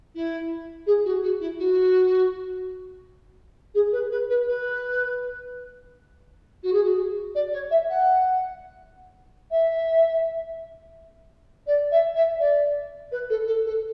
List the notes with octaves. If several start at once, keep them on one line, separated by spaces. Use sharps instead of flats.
E4
G#4
F#4
F#4
E4
F#4
G#4
B4
B4
B4
B4
F#4
G#4
F#4
D5
C#5
E5
F#5
E5
D5
E5
E5
D5
B4
A4
A4
A4